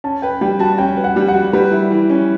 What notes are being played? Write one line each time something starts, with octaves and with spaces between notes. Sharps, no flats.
C#4 A5
B4 G5
G3 G5
F#4 A5
C#4 G5
B4
F#5
G3
F#5
F#4
G3 B4
E4
E3
C#4